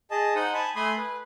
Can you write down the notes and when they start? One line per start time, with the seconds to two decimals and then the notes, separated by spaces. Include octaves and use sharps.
0.11 G#4 D#5 A5
0.35 D#4 C5 F#5 D#6
0.54 G#5 A5 B5
0.76 A3 G#5 B5 C6 D#6
0.97 B4